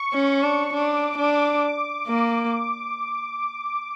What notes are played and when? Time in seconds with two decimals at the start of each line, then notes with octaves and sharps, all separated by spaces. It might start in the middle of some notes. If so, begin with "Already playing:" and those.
Already playing: C#6
0.13 C#4
0.43 D4
0.73 D4 D6
1.18 D4
2.07 A#3